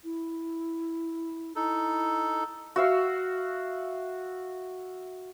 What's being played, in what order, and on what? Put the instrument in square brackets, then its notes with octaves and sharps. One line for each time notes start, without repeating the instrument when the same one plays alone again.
[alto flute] E4
[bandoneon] D#4 A4 [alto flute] E4
[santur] F#4 E5 F5